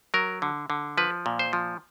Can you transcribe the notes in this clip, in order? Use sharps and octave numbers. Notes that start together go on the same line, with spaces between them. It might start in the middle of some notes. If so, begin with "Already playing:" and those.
F#3 A#4
D3
D3
F3 B4
A#2
C5
F3